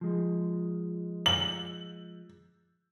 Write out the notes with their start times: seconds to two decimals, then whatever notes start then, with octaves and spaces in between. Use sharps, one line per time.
0.01 F3 G#3
1.26 F#7